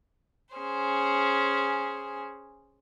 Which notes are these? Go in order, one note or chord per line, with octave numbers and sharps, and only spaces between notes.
C#4 G#4 C5